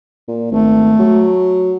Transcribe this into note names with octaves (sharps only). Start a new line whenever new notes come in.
A#2
G#1 A3
F#3